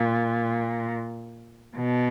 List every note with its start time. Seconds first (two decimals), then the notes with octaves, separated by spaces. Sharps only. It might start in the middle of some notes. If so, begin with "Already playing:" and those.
Already playing: A#2
1.76 B2